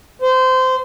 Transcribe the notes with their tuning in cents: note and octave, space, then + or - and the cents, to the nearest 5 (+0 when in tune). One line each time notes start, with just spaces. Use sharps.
C5 -20